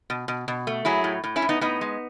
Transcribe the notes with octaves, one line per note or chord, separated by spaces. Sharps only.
B2
B2
B2
A3
F#3 E4 G#4
A2
A2
C#4 E4
A2
B3 D#4
A2 B3 D#4
G#3